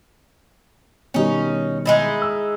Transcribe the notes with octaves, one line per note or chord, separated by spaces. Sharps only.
B2 D#3 G3 C#4 D#4
G#3 D#4 E4
E6